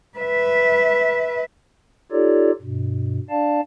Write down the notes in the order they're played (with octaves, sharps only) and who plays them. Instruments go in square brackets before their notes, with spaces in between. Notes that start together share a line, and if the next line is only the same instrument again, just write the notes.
[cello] B4 E5
[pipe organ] D#4 F4 G4 A4 C#5 D5
G2 B2
D4 D5 F5 A5